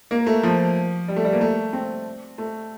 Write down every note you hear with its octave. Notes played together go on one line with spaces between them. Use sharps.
A#3
A3
F3
G3
A3
G3
A#3
A3
C4
A3